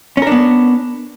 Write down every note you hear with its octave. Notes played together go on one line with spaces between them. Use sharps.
B3 C#4 D4 A#4